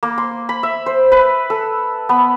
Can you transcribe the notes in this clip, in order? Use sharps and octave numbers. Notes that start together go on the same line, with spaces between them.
A#3
C6
B5
E5
C5
B4
A4
B3